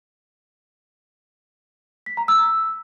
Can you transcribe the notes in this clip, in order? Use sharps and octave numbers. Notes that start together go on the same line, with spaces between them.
B6
A#5
E6